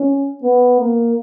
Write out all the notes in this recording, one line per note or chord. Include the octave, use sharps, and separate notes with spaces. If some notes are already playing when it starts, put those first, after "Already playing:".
Already playing: C#4
B3
A#3